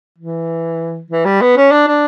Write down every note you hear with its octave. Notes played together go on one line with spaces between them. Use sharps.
E3
E3
G3
B3
C#4
D4
D4